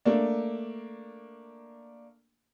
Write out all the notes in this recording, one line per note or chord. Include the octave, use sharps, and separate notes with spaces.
A3 A#3 D4